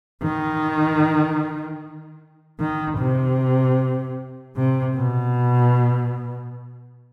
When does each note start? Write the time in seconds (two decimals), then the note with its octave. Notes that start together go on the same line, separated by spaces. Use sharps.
0.23 D#3
2.59 D#3
2.98 C3
4.56 C3
4.96 B2